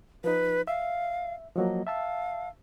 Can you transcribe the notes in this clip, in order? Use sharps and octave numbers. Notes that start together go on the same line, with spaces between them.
F3 D#4 B4
E5 F5
F3 F#3 A#3 D#5
E5 F5 A5 E6